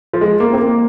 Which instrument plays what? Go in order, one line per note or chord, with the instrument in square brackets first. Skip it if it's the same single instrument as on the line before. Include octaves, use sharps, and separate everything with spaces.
[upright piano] F3
G#3
A#3
C4
A#3